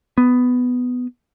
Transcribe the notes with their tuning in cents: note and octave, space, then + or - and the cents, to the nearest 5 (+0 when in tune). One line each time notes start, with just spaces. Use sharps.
B3 +10